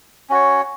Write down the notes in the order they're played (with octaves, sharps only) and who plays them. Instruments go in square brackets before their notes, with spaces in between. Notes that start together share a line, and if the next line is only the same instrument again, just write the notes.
[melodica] C#4 F#4 C#5